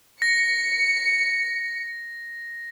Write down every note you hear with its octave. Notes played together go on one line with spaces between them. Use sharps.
A#6 C#7